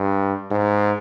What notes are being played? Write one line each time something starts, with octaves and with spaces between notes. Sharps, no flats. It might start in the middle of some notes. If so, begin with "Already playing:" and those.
Already playing: G2
G#2